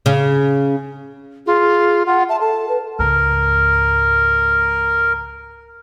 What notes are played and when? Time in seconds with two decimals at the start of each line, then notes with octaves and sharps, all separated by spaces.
0.06 C#3
1.47 F4 G#4
2.06 F4 F#5
2.29 E5 A5
2.41 A4 A5
2.69 B4
2.99 C#2 G#2 A#4